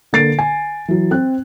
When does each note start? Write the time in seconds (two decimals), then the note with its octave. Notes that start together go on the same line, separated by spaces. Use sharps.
0.13 D3 A#3 A6 C7 D7
0.39 G#5
0.88 E3 F#3
1.11 C4 F#6